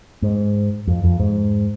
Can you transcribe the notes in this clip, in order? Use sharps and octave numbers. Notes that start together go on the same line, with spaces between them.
G#2
F2
F2
G#2